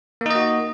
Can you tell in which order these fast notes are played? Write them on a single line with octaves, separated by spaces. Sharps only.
A#3 D#4 D#5 F#4